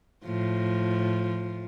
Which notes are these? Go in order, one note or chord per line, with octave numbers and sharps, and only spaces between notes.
A2 F3